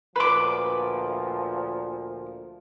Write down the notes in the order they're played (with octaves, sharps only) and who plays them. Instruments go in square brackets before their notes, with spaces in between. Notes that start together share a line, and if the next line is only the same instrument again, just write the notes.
[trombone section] D2 A#2 F3 [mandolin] B4 D6